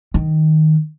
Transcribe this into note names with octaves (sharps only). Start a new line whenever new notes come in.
D#3